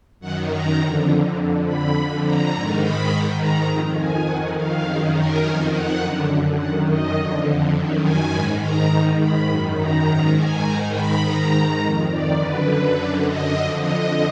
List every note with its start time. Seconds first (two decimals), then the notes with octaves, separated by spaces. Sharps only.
0.20 F#2 D#3 F#5
0.50 A#5
0.78 F2 D3
1.36 F2 D3
1.65 B5
1.94 F2 D3 B5
2.24 A#5
2.53 G#2 D#3 A#5
2.81 B5
3.10 G#2 D#3 A#5
3.40 A#5
3.69 F2 D#3
3.98 G#5
4.26 F2 D#3 F#5
4.55 F5
4.84 F#2 D#3 G#4
5.13 A#4
5.42 F2 D#3 G#5
5.72 F#5
6.00 F#2 D3
6.58 F#2 F#5
6.62 D#3
6.87 D#5
7.17 F2 D3
7.74 F#2 D#3
8.04 G#5
8.32 G#2 D#3 B5
8.61 A#5
8.90 G#2 D#3
9.19 B5
9.49 F#2 D#3
9.77 A#5
10.06 G#2 D#3 A#5
10.35 G#5
10.64 G#2 D#3 A#5
10.94 B5
11.22 G#2 D#3 A#5
11.80 F2 D#3
12.09 D5
12.38 F#2 D3 B4
12.96 F#2 D3 D5
13.26 D#5
13.54 F2 D3 D#5
13.83 D#5